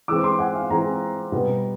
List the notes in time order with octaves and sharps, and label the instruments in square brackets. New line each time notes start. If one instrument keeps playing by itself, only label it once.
[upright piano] E3 G#3 C4 D6 E6
C6 D6
F#5 G#5
F5
E3 G#3 C4 G#5 A#5
B2 G3 B3